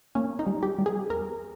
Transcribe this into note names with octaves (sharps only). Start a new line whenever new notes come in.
A#3 C#4
D#4
G3
G4
G3
G#4
E2 A#4